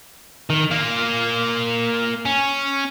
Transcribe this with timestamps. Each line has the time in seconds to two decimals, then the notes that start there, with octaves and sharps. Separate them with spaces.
0.50 D#3
0.71 A#3 F4
2.25 C#4